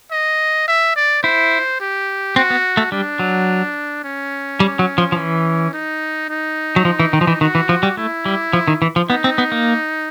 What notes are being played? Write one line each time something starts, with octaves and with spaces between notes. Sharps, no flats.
D#5
E5
D5
E4 C5
G4
C4 F#4
B3
A3
G3 D4
F#3
C#4
G3
F#3
F3
F3
E3
D#4
D#4
F#3
F3
E3
D#3
F3
E3
D#3 F#4
E3
F3
G3
A3 E4
G3
F3
D#3
E3
F3
B3 D#4
C4
B3
A#3